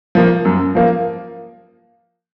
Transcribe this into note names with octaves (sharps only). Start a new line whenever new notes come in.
F3 A#3
F#2
F3 A#3